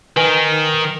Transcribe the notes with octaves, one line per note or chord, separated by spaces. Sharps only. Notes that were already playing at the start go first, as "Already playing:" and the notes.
D#3 B4 G#5